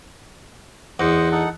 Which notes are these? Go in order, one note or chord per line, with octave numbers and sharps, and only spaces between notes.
E2 C5 D#5 F#5
D#4 A4 F#5